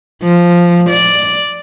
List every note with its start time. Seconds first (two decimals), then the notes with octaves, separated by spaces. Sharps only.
0.23 F3
0.90 D5